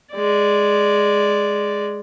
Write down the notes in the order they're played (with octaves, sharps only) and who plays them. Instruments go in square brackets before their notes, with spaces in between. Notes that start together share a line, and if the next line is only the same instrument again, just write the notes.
[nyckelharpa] G#3 D5